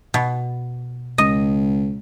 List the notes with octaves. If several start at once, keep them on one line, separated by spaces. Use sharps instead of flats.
B2
C#2 D#5